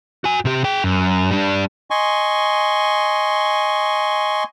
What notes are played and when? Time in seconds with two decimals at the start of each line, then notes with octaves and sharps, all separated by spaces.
0.24 F#4 G#5
0.45 C3 G4
0.64 G#4 G5
0.84 F#2
1.31 G3 D4
1.91 D#5 G#5 C6 C#6